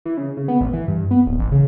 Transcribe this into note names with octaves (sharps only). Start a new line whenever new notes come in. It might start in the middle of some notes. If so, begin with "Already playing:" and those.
E3
C#3
C#3
B3
A1
E3
G2
B3
D1
A1
C#3